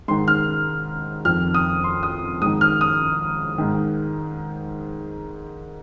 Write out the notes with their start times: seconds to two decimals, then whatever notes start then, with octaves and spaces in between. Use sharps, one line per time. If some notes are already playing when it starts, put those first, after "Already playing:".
0.08 G#2 D#3 C6
0.28 F6
1.25 F2 D#3 F6
1.54 D#6
1.84 C6
2.03 D#6
2.41 G#2 D#6
2.46 D#3
2.61 F6
2.81 D#6
3.58 G#2 D#3